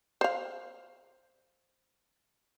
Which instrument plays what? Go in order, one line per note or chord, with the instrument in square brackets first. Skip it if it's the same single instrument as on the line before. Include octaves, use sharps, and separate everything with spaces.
[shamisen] C5 F5